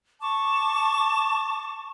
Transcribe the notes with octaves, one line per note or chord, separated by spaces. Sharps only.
A5 C#6 D6